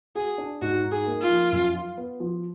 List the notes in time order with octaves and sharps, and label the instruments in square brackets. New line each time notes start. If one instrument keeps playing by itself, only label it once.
[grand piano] F#4 [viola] G#4
[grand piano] D4
[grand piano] G#2 [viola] F#4
[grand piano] D#4
[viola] G#4
[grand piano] A#3
[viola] F4
[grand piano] F3
F#2
F4
B3
F3